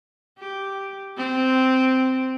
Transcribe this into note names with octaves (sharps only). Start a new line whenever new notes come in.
G4
C4